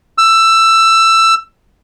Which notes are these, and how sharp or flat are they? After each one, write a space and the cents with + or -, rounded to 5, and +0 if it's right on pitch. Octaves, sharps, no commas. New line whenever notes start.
E6 +15